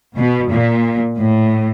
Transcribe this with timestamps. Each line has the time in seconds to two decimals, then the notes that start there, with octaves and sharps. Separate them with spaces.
0.18 B2
0.51 A#2
1.18 A2